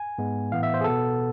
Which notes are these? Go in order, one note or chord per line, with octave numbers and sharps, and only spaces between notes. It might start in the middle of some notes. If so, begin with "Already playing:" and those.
Already playing: G#5
G#2 G#3 B3
A2 E3 B3 F5
E5
C5
G#4
B2 B3 A4